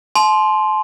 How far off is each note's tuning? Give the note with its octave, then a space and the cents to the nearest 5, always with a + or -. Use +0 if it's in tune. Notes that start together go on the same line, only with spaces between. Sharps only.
A5 -40 C6 +0